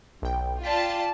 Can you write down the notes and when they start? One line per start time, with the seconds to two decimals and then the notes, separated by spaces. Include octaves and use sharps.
0.22 B1 G5
0.63 F4 D5 G5 A5 B6